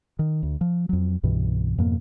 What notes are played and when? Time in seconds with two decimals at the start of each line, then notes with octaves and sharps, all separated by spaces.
0.19 D#3
0.43 D2
0.61 F3
0.89 F2 F#3
1.23 C2 G2 B2 E3
1.78 F2 G#2 B2 A#3